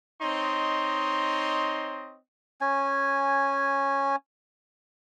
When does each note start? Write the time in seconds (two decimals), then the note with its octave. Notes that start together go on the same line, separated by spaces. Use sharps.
0.22 C4 D#4 C#5 D#5 C6
2.61 C#4 G#5